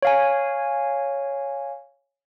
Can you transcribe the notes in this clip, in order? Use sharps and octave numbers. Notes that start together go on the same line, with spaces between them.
C#5 F5 G#5